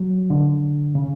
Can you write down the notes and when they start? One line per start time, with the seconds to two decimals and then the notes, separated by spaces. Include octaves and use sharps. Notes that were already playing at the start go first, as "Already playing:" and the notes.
Already playing: F#3
0.30 D3
0.95 C#3